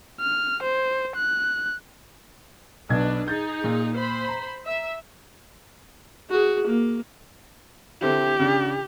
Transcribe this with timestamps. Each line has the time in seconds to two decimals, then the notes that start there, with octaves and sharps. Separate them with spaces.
0.20 F6
0.63 C5
1.16 F#6
2.89 B1 B2 D4 B4 G#6
3.28 D#4 G#4 G6 A6
3.64 A#2
3.95 C5 B5
4.28 A#5
4.66 E5
6.30 F#4 G#4
6.67 A#3
8.02 D3 C4 E4 G4
8.39 C#3 D4